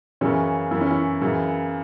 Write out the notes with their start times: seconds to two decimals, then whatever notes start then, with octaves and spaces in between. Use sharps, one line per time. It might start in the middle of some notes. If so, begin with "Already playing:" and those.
0.21 F#2 C#3 E3 C#4
0.71 F#2 E3 E4
0.81 C#4
0.90 E4
1.21 F#2 C#3 E3